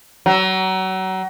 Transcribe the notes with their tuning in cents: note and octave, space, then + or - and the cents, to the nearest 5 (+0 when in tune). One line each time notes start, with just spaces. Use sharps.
F#3 +30